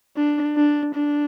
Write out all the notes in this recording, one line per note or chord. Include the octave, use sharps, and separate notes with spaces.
D4
D4
D4